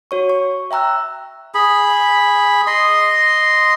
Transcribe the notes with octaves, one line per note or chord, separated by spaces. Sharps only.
F#4 C#5 C#6
C#6
E5 G5 A#5 E6 F#6
G#4 B5
D#5 C6